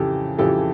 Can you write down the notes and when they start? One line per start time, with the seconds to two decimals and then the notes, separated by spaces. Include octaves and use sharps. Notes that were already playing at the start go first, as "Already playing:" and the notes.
Already playing: F2 C#3 E3 G4 A4
0.38 F2 C#3 E3 G4 A4